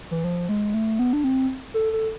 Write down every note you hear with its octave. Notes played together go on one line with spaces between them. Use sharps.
E3
F3
G#3
A3
B3
D4
C4
A4
A4